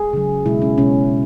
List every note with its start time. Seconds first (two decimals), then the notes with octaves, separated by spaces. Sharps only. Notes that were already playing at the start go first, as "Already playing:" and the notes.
Already playing: G#4
0.13 C#3 F#3
0.46 B2 G#3 E4
0.62 C#4
0.78 B2 G#3 C#4